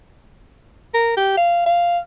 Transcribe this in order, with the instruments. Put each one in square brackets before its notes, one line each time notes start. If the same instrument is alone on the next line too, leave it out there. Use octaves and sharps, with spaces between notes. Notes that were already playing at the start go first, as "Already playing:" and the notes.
[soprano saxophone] A#4
G4
F5
F5